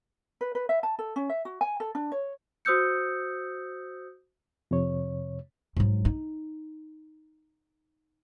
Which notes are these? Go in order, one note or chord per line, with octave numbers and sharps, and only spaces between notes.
B4
B4
E5
A5
A4
C#4
E5
F#4
G#5
A4
D4
C#5
F#4 C5 D#6 E6 G6 C#7
F2 C3 C#5
G#2 F#3
D#4